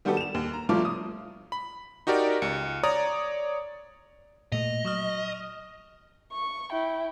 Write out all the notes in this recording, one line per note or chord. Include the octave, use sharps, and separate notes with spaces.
D#3 G3 B3 F#4 G4 A4
E7 F7
D#2
A#5
G1 G2 F3 A3 F4 D6
D#6
B5
D#4 F#4 G4 A#4 D5
C#2 C#7
C#5 D5 A#5 D#6
A#2 A3 D#5 F7
F#3 C#6 D#6 F6
C#6
E4 G5